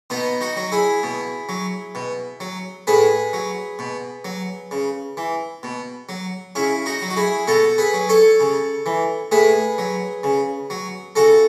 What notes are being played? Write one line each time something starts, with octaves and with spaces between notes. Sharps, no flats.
B2 B3 D#4
D#4 F#4
F#3
E4 G#4
B2
F#3
B2
F#3
A2 G#4 B4
F#3
B2
F#3
C#3
E3
B2
F#3
C#3 C#4 E4
D#4 F#4
F#3
F#4
E4 G#4
B2 F#4 A4
G#4 B4
F#3
A4 C#5
C#3
E3
A2 G#4 B4
F#3
C#3
F#3
C#3 F#4 A4